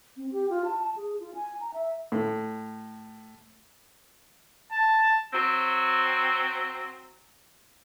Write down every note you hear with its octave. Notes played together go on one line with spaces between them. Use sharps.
C4
G4
F4
A5
A5
G#4
F4
G#5
A#5
E5
A2
A5
F#3 C4